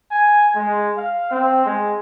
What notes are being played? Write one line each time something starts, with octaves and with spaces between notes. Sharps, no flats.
G#5
G#3
F5
C4
G#3